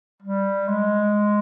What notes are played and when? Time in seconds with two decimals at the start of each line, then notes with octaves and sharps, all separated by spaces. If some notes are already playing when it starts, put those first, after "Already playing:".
0.22 G3
0.68 G#3